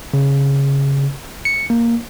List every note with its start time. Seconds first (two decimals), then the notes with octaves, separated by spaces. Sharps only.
0.14 C#3
1.45 C#7
1.70 A#3